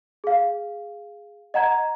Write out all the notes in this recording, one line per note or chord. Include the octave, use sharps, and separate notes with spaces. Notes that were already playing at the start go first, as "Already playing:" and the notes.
G#4 F5
D#5 F#5 A#5 G#6